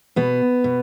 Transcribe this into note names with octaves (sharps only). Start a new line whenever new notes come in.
B2 B3
B2